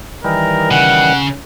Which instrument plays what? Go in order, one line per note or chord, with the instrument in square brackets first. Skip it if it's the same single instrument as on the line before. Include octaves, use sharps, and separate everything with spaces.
[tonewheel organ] D#3 E3 G3 [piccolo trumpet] A#4
[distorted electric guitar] C#3 [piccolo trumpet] F#5